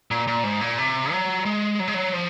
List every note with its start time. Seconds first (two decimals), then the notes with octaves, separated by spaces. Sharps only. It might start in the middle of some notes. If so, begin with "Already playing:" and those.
0.11 A#2
0.27 A#2
0.43 G#2
0.61 A#2
0.78 C3
1.12 F#3
1.45 G#3
1.80 F#3
1.88 G#3
1.94 F#3
2.13 F3